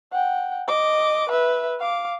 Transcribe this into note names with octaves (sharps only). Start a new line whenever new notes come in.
F#5 G5
D#5 D6
B4 E5
F5 D6